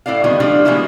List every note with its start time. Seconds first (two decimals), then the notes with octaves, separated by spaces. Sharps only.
0.06 A2 E4 A4 D5 F5
0.24 B2 D#3 G3 G#3 C4
0.40 F3 G3 A3 D4 F4 F5
0.65 B2 E3 G#3 A#3 E4